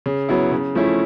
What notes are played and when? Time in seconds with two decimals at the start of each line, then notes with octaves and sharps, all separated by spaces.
0.06 C#3
0.29 F#3 B3 E4
0.52 C#3
0.75 F3 A3 C#4 E4